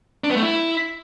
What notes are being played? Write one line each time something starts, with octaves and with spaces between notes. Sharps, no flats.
D4
B3
A3
E4